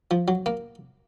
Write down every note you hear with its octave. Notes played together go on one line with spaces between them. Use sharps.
F3
F#3
A#3